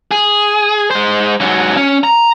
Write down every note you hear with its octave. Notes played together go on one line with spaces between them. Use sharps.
G#4
G#3 C5
G#2 F#3
C#4
A#5